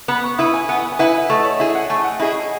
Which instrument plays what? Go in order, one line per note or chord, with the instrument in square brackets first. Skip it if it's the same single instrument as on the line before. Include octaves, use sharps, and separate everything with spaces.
[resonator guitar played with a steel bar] B3 [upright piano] B5
[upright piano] C#6
[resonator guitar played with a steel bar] E4 B4 [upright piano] D#6
[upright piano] G#5
[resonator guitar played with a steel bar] B3 [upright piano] F#5
[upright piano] G#5
[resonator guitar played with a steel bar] E4 B4 [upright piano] F#5
[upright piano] E5
[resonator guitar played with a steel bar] A3 [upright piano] D#5
[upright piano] C#5
[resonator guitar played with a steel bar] E4 G#4 [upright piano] E5
[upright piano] F#5
[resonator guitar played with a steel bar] A3 [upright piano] G#5
[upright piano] F#5
[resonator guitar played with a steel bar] E4 G#4 [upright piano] D#5